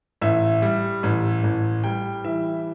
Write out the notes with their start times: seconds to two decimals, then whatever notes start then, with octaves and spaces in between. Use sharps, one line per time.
0.21 A1 E5
0.62 G3
1.03 A1
1.43 A1
1.84 G3 G5
2.24 E3 E5